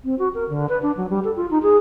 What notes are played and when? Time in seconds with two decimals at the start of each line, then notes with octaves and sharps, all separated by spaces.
0.05 C4
0.19 F#4
0.34 A#4
0.49 D3
0.69 B4
0.82 D4
0.97 F#3
1.10 G3
1.24 A4
1.36 F4
1.51 D#4
1.63 G#4